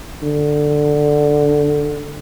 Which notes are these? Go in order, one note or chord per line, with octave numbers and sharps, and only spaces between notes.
D3